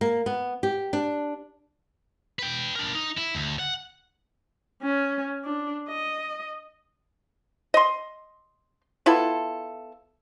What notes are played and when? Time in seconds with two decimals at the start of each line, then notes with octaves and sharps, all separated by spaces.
0.01 A#3
0.26 B3
0.63 G4
0.93 D4
2.39 B4 G5
2.76 D4 A#4
2.95 D#4
3.17 E4
3.35 D2
3.59 F#5
4.83 C#4
5.44 D4
5.89 D#5
7.74 D#5 C6
9.06 B3 E4 F4 A4